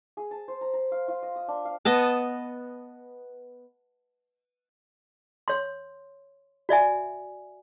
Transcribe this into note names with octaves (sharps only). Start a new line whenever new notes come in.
G#4
A5
C5
A#5
A#5
F5
F4
D#5
D#6
D4
F5
B3 D#5 A5
C#5 C6
F#4 D5 E5 G#5